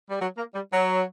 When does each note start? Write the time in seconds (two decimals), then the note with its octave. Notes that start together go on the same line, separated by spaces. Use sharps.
0.09 G3
0.21 F#3
0.37 A#3
0.54 G3
0.71 F#3